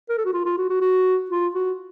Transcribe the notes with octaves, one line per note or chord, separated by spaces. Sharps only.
A#4
A4
F#4
F4
F4
F#4
F#4
F#4
F4
F#4